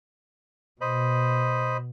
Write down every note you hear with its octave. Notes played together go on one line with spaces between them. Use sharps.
B2 C5 D#5 B5